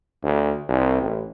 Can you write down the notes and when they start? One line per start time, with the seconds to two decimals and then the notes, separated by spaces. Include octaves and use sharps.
0.23 D2
0.69 C2
1.02 A1